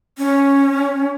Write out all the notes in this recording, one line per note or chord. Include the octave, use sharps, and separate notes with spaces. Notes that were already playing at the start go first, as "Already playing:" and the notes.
C#4